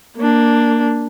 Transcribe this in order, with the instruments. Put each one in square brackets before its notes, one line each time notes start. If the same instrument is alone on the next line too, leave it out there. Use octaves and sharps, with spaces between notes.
[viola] A#3 D4